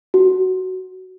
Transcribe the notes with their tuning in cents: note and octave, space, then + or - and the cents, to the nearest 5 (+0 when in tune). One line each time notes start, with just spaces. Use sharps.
F#4 +10